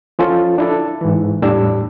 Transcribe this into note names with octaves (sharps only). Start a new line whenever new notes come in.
F3 C#4 F4 A4
D4 E4 A4
G#2 E3
E2 A2 G3 D4 E6